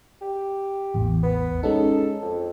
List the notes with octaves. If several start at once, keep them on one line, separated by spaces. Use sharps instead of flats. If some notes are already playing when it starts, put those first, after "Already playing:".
G4
A1 E2
B3
G#3 C#4 D#4 A4
F2